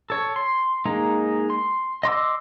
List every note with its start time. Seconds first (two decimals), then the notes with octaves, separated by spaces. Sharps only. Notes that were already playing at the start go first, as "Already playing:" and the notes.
0.10 A4 C#5
0.36 C6
0.85 G#3 A#3 D#4
1.50 C6
2.03 D#5 C6 D6 E6